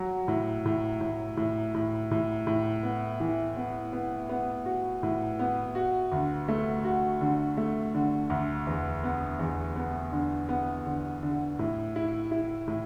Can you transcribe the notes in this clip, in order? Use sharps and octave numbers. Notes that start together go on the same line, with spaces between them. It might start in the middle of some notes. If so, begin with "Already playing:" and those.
Already playing: F#3
A2
A2
A2
A2
A2
A2
A2
B3
E3
B3
B3
B3
F#4
A2
B3
F#4
D2
A3
F#4
D3
A3
D3
D2
E2
B3
E2
B3
D3
B3
D3
D3
A2
E4
E4
A2